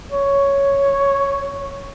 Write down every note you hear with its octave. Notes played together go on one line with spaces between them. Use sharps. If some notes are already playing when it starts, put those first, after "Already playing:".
C#5